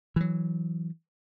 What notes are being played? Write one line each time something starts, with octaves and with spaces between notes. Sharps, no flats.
E3 F#3